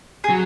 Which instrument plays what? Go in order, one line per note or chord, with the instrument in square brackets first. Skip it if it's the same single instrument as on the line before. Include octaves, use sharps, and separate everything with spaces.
[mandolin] G#4
[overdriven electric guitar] F#3